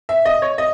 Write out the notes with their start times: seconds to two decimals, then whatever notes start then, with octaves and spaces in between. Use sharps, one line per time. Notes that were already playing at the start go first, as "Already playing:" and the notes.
0.09 E5
0.25 D#5
0.42 C#5
0.58 D#5